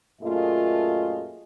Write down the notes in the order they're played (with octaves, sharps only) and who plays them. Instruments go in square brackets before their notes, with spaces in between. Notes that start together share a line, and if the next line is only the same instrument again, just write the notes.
[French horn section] F#2 A#2 A3 F4 G#4 D#5